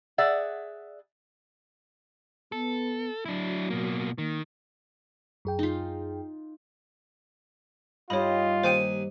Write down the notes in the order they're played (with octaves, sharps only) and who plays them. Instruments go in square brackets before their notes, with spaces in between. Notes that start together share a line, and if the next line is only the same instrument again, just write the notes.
[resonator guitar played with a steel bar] G#4 D5 E5 F#5
[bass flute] B3 [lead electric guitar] A4
[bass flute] F#3 [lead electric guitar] D4 E4
[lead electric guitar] B2 A#3
[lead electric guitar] D#3 [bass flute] A#3
[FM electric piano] F#2 G#4 G5
[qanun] D#4 F4
[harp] G2 D#4 G4 [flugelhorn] F4 [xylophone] C#5 B5 [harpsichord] D#5
[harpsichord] D#2 G#5 D#6 [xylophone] C5 G5